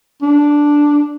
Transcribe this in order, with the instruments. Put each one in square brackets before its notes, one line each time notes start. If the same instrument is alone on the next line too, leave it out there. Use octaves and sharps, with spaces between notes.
[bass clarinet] D4